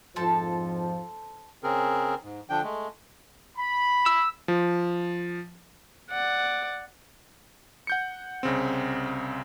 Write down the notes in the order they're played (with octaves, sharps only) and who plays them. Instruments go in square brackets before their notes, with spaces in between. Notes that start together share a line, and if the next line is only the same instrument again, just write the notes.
[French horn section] F2 G#2 F3 [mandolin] A4 C5 A5
[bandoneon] C#3 C4 G#4 A#4
G#2
D3 F3 D4 G5
G#3 A3
[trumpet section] B5
[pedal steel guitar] E6
[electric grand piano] F3
[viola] D5 F#5
[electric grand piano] F#5 G6 C#7
C2 C#3 C4